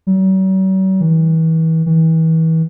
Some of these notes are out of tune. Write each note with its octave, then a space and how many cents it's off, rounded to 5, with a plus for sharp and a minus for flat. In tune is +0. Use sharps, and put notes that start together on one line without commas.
F#3 +45
E3 -35
E3 -35